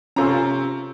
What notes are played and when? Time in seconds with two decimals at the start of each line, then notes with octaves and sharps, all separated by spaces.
0.16 C3 C#4 F4 A4 A#5